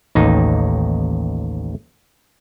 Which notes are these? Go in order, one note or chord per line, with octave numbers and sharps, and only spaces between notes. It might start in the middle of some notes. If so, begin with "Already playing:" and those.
A1 D#2 D#4